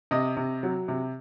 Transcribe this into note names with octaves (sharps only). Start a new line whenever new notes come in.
C3 D#5 D#6
C3
F#3
C3